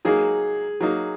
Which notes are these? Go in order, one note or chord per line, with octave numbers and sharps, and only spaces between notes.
F#3 A#3 D#4 G#4
F#3 A#3 D#4